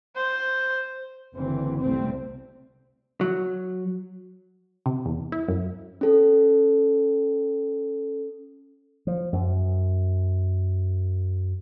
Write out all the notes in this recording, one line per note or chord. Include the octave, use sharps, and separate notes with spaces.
C5
F#1 D3 E3 C4
C2 G3 A3 C4
F#3
C3
E2
E4
F#2
C#4 A4
F3
F#2